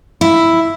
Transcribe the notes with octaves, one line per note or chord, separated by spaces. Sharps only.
E4